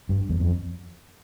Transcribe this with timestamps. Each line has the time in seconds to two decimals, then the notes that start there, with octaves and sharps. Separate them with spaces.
0.09 G2
0.29 E2
0.40 F2